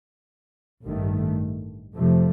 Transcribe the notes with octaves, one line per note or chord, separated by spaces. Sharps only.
A1 G2 D#3 A3
F2 C3 F3 A3